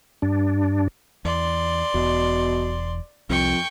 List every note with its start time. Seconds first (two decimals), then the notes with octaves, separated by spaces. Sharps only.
0.22 G2 D4
1.25 E2 D5 C6
1.95 E1 E2 B2
3.30 C2 F2 G5 C#6